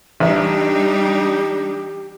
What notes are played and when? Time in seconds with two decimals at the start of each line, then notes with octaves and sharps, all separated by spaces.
0.20 A1 G3 D4 D#4 G4 E5